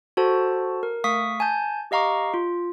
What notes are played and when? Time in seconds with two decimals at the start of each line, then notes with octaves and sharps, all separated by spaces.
0.17 F#4 A4 C5 A5
0.83 A#4
1.04 A3 F5 C#6 D#6 B6
1.40 G#5 A5 G6
1.91 G4 D#5 F5 A#5 C#6 D6
2.34 F4